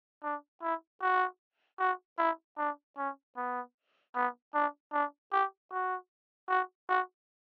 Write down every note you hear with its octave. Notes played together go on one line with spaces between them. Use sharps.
D4
E4
F#4
F#4
E4
D4
C#4
B3
B3
D4
D4
G4
F#4
F#4
F#4